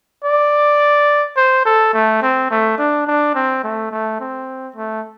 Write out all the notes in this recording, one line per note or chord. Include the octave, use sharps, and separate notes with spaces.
D5
C5
A4
A3
C4
A3
D4
D4
C4
A3
A3
C4
A3